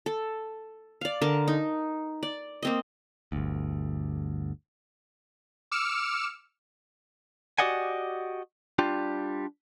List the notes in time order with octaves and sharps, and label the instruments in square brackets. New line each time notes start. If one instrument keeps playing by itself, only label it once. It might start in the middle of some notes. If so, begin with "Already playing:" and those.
[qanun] A4
D5 F5
D3 A#4 A5
D#4
D5
A#3 C4 D#5
[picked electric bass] G1 D2
[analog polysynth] D6 E6 F6 C#7 E7
[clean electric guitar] F#4 G4 D5 D#5 F#5 G#5
G3 D4 F4 G4